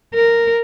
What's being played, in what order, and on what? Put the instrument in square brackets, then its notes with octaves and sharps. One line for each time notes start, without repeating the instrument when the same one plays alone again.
[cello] A#4